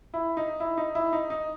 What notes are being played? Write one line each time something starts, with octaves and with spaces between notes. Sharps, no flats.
E4
D#4
E4
D#4
E4
D#4
D#4